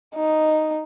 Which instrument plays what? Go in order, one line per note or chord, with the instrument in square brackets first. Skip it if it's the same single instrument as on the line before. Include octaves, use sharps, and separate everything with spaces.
[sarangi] D#4